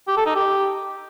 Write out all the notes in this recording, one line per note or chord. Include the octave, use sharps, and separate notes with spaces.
G4
A4
D#4
G4